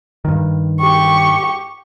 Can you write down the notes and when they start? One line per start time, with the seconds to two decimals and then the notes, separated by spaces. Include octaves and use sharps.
0.25 G2 D#3
0.80 G4 C#6